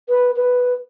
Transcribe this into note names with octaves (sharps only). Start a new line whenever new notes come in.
B4
B4